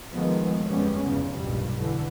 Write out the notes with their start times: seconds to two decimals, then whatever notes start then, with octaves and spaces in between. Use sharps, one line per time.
0.14 D#3 F3 G#3 A3 B3
0.67 G1 F2 G3 G#3 B3 C#4
1.04 F1 E2 G2 C#3
1.35 B1 G2 A#2 G3
1.78 D3 E3